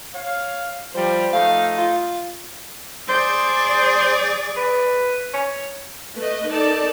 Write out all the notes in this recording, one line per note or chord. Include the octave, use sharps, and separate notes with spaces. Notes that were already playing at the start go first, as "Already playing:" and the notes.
C#5 F5
F3 G3 C5
F3 A3 D#4 F5
F4
G#4 C5 D5
B4
C#5
A3 B4 D#5
D#4 A4 A#4 D5 A5